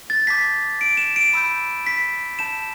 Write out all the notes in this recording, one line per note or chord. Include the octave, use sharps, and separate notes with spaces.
A6
A5 D6 G6 B6
D7
E7
D7
B5 E6 G6
B6
A5 G6 E7